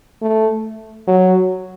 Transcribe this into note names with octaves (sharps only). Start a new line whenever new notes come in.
A3
F#3